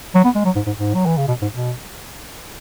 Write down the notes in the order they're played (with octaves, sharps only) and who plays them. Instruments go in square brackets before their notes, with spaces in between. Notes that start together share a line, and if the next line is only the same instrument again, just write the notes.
[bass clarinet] F#3
B3
G#3
F#3
G#2
G#2
G#2
F#3
E3
C#3
B2
G#2
B2